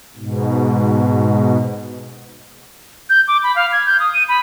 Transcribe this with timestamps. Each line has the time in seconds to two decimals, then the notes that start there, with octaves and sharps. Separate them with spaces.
0.17 G#2 B2
3.10 G6
3.28 D6
3.43 B5
3.56 F5
3.72 G#6
3.86 G6
4.00 D#6
4.14 D#7
4.29 B5